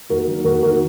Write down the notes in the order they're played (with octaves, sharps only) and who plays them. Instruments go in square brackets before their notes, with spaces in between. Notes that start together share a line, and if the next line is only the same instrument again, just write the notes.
[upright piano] D#2 F#4 A#4
D#3 F#3
D#2 F#4 A#4
D#3 F#3 F#4 A#4